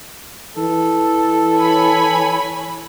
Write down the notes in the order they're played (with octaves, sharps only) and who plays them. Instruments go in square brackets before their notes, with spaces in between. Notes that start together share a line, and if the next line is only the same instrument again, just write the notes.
[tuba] E3 [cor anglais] A4
[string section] C#5 G#5 B5